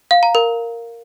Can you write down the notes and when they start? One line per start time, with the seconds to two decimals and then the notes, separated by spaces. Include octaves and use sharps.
0.11 F5
0.23 A#5
0.35 A#4